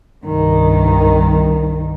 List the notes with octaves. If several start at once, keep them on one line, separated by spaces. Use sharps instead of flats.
C2 G2 D#3